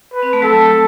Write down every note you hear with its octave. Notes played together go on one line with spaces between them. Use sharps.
B4
C4
A3
F#3 A4